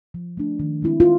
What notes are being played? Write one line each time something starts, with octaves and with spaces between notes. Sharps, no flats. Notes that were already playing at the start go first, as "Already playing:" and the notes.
F3
A3 D4
D#3
G#3 C4 E4
F4